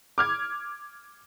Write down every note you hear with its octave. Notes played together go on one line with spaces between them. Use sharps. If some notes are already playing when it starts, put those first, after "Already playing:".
D6 F6 G#6